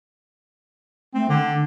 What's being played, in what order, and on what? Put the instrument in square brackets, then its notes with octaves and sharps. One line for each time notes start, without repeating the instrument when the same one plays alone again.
[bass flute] A3 [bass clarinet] C4
[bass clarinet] D3 [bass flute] D4